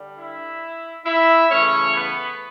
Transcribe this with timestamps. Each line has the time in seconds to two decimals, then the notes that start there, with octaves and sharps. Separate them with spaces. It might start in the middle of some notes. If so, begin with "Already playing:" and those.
Already playing: D3 G3 D4
0.18 E4 E5
1.06 E4 E5
1.50 C#3 E3 A3 C#4 C#5
1.94 B3 B4